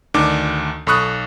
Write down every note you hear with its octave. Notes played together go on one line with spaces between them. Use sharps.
D2 D#3 D4 D6
B1 A4 B5 C#6 D#6 F#6